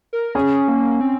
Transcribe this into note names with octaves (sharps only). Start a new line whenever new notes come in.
A#4
C#4 G#4
A#3
C4